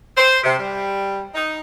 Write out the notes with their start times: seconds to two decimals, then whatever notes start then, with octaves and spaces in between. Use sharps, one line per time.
0.16 C5
0.44 C3
0.58 G3
1.35 D#4